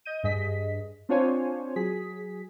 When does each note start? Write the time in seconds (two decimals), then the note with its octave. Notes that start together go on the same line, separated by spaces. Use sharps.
0.05 D#5 G6 D#7
0.24 G2 G#4 D#5 B6
1.09 C4 D4 F4 C5 C#5 G#5
1.76 F#3 G#4 B6